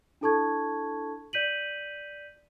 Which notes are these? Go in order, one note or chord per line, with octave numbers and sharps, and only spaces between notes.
D4 E4 A4 A5 C#6 G#6
D5 G6 B6 D#7 F#7